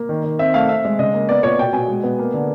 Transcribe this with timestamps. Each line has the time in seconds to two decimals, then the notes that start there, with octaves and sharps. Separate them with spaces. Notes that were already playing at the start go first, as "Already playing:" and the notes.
Already playing: A#3
0.09 D#3
0.24 D#3
0.39 C4 E5
0.54 A3 F5
0.69 C4 E5
0.85 G#3
0.99 C#3 D#5
1.14 A#3
1.29 B3 D5
1.43 A#2 C#5
1.58 B2 G5
1.73 B2 G#5
1.88 G#3
2.03 B3
2.19 A#3
2.34 D3